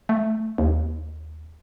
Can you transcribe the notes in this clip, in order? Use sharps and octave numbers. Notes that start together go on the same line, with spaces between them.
A3
D#2